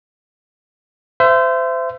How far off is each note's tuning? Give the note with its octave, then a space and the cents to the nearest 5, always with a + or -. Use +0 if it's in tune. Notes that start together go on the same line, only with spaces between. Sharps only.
C5 -25 E5 +25